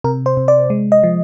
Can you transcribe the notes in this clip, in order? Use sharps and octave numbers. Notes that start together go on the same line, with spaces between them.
C3 A#4
C5
C3
D5
G#3
D#5
F3